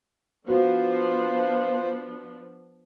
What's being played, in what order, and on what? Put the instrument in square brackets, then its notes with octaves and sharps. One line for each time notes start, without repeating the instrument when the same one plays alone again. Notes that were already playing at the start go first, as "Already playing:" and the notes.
[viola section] F3 B3 D4 [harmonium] F4 C5 [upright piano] F#4